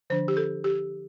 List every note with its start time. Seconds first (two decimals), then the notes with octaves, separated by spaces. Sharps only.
0.10 D3 F3 D4 C5
0.28 G4
0.37 A4
0.64 G4